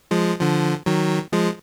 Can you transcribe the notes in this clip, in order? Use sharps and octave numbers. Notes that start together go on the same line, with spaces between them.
F3 G#3
D3 F3
D#3 F#3
F3 G#3